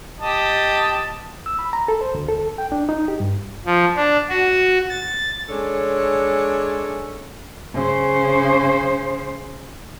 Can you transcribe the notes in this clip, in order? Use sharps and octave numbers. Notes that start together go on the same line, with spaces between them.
G4 D#5 A5
E6
B5
A#5
A4
C5
D2
A4
G5
D4
D#4
G4
G2
F3
D4
F#4
A6
G#3 C#4 D4 A4 C#5
C#3 C5